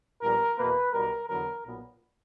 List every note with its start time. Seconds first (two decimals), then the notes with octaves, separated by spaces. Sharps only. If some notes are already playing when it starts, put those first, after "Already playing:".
0.22 A#1 A#2 G3 B3 A#4
0.58 E2 B2 A#3 B4
0.93 B1 B2 G3 A#4
1.29 E2 D3 F#3 B3 A#4
1.65 B1 A#2 F#3 B3